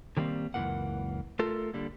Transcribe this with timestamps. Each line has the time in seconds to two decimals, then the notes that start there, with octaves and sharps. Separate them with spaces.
0.17 D3 D#3 G3 A#3 C4
0.54 C#2 F#2 C3 E3 A#3 F#5
1.39 A3 F4 A4 A#4
1.74 D3 G3 A#3